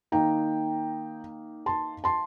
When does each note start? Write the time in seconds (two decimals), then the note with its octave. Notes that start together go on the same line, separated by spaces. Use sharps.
0.12 D#3 A#3 D#4 G5 A#5
1.66 A5 C6
2.04 A5 C6